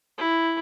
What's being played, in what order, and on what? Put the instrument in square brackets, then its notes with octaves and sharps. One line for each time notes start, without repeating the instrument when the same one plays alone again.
[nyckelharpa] E4